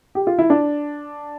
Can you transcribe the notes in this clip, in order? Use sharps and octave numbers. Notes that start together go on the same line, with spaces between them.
G4
F4
E4
D4